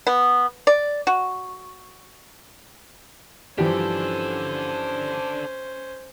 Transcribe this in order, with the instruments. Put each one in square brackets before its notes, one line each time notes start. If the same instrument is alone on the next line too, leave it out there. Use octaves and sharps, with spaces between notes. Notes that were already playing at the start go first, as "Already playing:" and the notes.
[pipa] B3
D5
F#4
[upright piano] G2 E3 F3 [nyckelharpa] C#4 C5 [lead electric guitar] D4 A4 [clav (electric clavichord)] G4